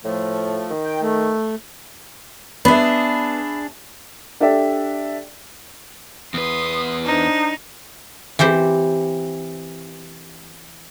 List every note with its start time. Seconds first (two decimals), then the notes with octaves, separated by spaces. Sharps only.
0.05 A2 F3 A3
0.71 D#3
0.85 G5
1.02 A3
2.65 B3 D4 G#4 E5 B5
4.40 D4 G4 A4 D5 E5
6.34 E2 B4 C6 D#6
7.05 D4 D#4 C5
8.39 E3 C4 G4 C5